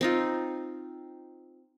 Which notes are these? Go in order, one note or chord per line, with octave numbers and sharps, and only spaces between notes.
C4 D#4 F4